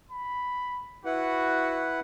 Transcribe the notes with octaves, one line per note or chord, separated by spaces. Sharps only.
B5
E4 F#4 B4 F#5